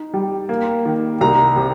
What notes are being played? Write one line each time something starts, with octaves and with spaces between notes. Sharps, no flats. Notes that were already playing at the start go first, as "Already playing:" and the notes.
Already playing: D#4
G3
A#3
D#3
C2 A#5
C3